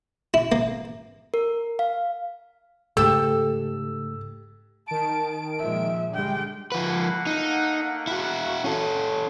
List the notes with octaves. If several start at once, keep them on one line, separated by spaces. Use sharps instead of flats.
E4
A#3
A#4
F5
G#2 C#3 A3 G4 A4 E6
D#3 A5 D7
A#2 F3 G#3 E5
D3 G3 G#3 G5
F3 A3 A#3 B4 F#5
D#4
E4 F#4
C#4 A4